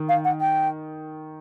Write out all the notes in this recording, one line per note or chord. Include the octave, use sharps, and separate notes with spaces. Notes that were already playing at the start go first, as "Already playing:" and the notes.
Already playing: D#3
F5
F#5
G5